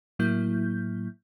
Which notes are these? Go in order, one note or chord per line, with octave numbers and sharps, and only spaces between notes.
A2 F#3 A#3 E4 G6